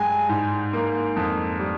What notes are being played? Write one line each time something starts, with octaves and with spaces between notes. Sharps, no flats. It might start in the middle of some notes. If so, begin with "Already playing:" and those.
Already playing: G2 G#3 G5 G#5
G#2
A#3
F2
G3